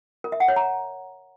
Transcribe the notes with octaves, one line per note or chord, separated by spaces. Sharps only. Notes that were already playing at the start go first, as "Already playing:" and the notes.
A#4
E5
F#5
C#5
A#5